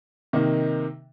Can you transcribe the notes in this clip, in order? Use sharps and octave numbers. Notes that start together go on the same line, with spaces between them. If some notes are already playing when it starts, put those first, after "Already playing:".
C3 D#3 A#3 D#4